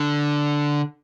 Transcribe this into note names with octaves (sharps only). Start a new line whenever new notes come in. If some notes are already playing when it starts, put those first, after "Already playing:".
Already playing: D3